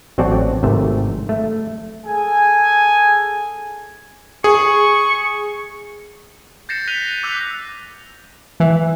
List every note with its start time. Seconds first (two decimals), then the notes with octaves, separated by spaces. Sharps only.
0.18 A1 F#3 C4 F#4 D5 A5
0.63 G#1 G#2 C3 A3 E5
1.29 A3
2.06 G#4 A4 G#5
4.44 G#4 C#6
6.69 G6 A6 A#6 C7 C#7 E7
6.87 F#6 A#6 B6 D#7 F7 G7
7.23 D6 E6 F#6 G6 B6 F7
8.60 E3